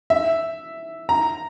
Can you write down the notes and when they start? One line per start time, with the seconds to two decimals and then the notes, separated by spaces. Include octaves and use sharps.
0.10 E5
1.09 A#5